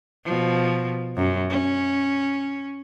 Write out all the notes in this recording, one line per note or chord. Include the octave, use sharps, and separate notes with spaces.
B2 F3
F#2
C#4